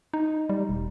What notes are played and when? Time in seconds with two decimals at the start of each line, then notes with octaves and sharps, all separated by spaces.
0.14 D#4
0.49 G3
0.69 E1